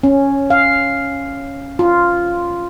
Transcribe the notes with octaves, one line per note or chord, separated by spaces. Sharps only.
C#4
F5
F4